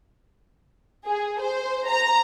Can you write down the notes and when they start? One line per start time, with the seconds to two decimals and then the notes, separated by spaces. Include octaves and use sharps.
1.05 G#4
1.40 C5
1.89 A#5